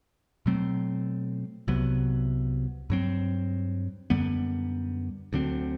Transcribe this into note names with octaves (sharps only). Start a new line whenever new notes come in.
B2 F#3 A3 C4
C2 C3 F#3 B3
G2 F#3 C4
F#2 D3 G3 B3
D2 D3 F#3 C4